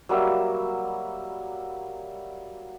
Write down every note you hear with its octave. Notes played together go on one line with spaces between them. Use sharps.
F#3 G3 A#3 E5